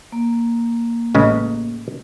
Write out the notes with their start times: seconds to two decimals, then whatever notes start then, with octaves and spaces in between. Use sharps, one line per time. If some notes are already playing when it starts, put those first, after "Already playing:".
0.12 A#3
1.15 A1 C#3 G#3